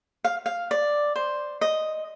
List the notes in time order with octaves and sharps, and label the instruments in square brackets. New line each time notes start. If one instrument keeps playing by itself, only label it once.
[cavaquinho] F5
F5
D5
C5
D#5